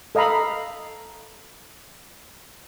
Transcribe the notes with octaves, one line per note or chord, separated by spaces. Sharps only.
A4 D#5 F5 A#5 B5